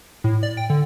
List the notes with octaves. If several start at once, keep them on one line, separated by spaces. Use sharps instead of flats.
A2
D5
G5
D3